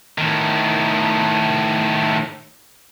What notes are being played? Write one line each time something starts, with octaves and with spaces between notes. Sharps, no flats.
A2 D#3